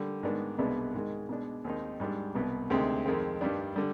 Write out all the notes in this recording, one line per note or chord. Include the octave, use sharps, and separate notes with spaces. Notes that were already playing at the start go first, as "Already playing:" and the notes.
Already playing: D3 G3
G#2 D#3 B3 D4
C2 B2 G#3 B3 D4
G#2 D#3 G#3
B2 G#3 D4
D#2 D#3 G#3 C4 D#4
G#2 G3 D4
C2 B2 B3
D2 C3 D#3 G#3 C4
F2 D#3 G#3 C4
G2 D#3 G3 D4
D3 G3